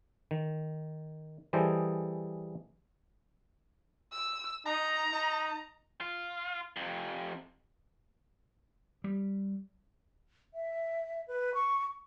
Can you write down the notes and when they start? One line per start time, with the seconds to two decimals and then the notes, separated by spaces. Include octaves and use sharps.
0.31 D#3
1.53 E3 G3 G#4 A4 C5 D#5
4.12 E6
4.66 D#4 A#5
5.12 D#4
6.01 F4
6.77 F2 C3
9.04 G3
10.54 E5
11.28 B4
11.54 C#6